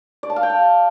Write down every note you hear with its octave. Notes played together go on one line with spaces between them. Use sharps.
D5
A5
F5
G5
A5